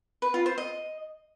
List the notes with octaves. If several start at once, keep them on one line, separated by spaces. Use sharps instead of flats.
B4
F4
C5
D#5